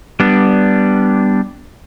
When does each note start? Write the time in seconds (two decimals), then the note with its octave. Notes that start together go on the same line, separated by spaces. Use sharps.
0.20 G3 B3 D4